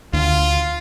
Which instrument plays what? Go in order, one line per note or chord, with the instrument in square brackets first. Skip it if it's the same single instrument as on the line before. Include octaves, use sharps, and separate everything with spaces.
[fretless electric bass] D2 [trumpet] F4